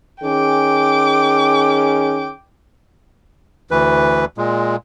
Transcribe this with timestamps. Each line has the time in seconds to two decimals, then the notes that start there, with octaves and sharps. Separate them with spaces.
0.23 D#3 C#4 G#4 G5 D6
3.71 D2 E3 B4
4.38 A#2 G#3